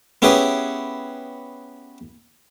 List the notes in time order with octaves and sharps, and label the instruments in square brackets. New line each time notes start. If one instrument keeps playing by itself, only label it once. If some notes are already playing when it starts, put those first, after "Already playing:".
[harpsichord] B3 C#4 E4 G4 G#4 B4